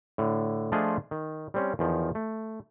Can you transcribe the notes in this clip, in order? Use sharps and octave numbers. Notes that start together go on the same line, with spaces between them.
A2 D3
F3 A3 D4 F4 G#4 D#5
D#3
G3 C4 C#4
E2 D#3 F3
A3